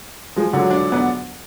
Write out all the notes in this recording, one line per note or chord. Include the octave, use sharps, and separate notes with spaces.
F3 G#3
D3 F#3
D4
B3 D4